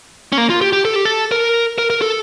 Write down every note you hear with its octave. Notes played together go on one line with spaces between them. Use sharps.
C#4
A#3
F4
G4
G4
A4
G4
A4
A#4
A#4
A#4
A4